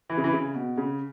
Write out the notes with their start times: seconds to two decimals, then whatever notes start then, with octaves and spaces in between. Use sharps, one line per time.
0.10 E3
0.17 C#3
0.24 E3
0.33 C#3
0.55 B2
0.77 C#3